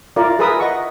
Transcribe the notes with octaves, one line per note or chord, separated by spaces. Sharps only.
E4 F4 A#4 D5
G#4 A#4 B4 E5 D#6
D#5 F#5 C#6